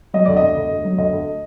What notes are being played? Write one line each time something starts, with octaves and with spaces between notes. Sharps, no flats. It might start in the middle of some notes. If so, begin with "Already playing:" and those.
F#3 D#5
D2 D5
D#5
D2
D2
D2
F#3
D2 D#5
D2